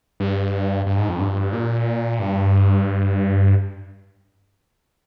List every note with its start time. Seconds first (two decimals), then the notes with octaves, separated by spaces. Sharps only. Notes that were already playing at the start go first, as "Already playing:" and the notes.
0.20 G2
0.86 G2
0.98 G#2
1.09 F2
1.20 G2
1.53 A#2
2.19 G2